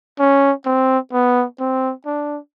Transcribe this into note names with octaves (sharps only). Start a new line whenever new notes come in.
C#4
C4
B3
C4
D4